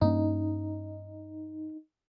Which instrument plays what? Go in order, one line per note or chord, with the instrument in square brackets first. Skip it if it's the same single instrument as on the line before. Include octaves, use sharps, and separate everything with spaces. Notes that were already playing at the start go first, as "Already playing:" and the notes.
[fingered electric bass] G2 A#3 C#4 [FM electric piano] D#4